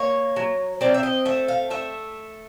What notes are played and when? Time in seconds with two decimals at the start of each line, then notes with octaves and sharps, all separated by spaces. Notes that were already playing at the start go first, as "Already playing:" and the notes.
Already playing: A#3 C#5
0.36 F#3
0.81 C4 D5
0.94 E5
1.03 D#5
1.25 A3 E5
1.48 F5
1.70 A3 E5